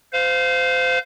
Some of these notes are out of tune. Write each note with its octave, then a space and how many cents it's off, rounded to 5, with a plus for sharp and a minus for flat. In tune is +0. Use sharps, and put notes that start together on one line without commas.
C5 -30 F5 +0